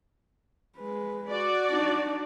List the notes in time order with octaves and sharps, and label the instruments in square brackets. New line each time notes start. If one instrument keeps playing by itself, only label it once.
[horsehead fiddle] G#3 B4
[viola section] F#4 D5
[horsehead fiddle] D4 D#4